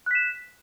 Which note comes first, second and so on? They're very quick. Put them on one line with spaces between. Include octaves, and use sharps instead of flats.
F#6 B6 E7